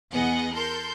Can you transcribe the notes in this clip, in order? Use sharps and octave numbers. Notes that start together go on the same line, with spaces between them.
E2 B3 G#4 D#5 F#5
A4 A#4 C6 G6